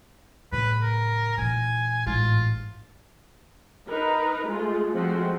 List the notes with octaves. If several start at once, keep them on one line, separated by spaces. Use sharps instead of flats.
A2 C#3 B4
A#4
A#2 E3 G#5
A1 G#2 F4
D#4 A#4 B4
G#3 A3 F4
F3 G#3 A3 C4 F#4